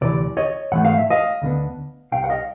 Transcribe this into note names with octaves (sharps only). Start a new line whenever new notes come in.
D2 C3 E3 D5
C#5 D#5
G#2 E3 A3 F#5
F5
E5
D#5 F5
D2 D3 G3 B3 D4
C2 C3 F5 G5
F#5
D#5 F5